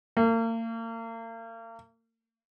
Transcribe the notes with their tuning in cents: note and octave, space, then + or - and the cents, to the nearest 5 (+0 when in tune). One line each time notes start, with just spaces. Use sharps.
A#3 -40